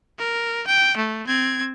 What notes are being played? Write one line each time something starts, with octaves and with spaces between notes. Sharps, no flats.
A#4
G5
A3
C4 G#6